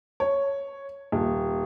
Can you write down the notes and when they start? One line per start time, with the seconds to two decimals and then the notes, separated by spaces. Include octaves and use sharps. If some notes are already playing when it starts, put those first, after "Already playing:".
0.20 C#5
1.12 D#1